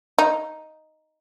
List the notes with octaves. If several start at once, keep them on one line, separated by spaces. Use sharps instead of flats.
D#4